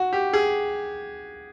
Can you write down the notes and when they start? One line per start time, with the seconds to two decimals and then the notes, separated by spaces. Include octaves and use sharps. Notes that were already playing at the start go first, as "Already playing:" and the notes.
Already playing: F#4
0.13 G4
0.33 G#4